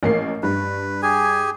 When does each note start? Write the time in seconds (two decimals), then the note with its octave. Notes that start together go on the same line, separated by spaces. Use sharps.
0.03 A1 A#3 C7
0.43 G2 B4
1.02 G4 G#4 G#5